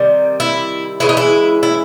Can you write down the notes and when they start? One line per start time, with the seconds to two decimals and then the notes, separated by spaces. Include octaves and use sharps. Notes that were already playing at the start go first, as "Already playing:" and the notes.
Already playing: C3 D#3 G3
0.40 E4
1.00 C#3 E3 G#3 E4
1.09 D#4
1.17 E4
1.63 E4